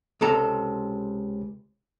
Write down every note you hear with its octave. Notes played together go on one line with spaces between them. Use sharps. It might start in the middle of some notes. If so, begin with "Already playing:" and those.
C#2 C3 A4 A#5